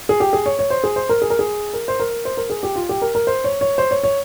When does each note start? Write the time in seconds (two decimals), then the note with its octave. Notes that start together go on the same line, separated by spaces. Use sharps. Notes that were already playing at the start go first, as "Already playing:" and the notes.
0.09 G#4
0.20 G4
0.33 G#4
0.46 C#5
0.59 C#5
0.70 C5
0.84 G#4
0.96 C5
1.09 A#4
1.22 G#4
1.30 A#4
1.39 G#4
1.73 A#4
1.88 C5
2.00 A#4
2.25 C5
2.37 A#4
2.50 G#4
2.63 G4
2.76 F4
2.89 G4
3.02 A#4
3.15 A#4
3.27 C5
3.44 C#5
3.61 C#5
3.78 C5
3.91 C#5
4.04 C#5